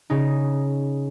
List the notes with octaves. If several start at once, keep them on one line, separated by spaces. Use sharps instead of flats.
C#3 D#4